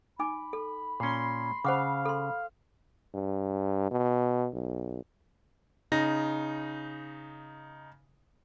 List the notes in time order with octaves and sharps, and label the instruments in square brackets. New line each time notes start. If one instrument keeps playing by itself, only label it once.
[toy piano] D#4 G#5 D6 [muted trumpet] B5
[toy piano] A4
[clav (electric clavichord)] A#2 C#4 [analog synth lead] C6
[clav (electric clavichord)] C#3 [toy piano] C5 F#5 D6 [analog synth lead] F5
[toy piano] A4 C6
[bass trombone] G2
B2
B1
[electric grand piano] C#3 D#4 A#6